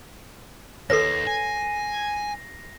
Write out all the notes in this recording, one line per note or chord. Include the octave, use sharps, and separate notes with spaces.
D#2 A4 B4 C#5 A#6 C7
G#5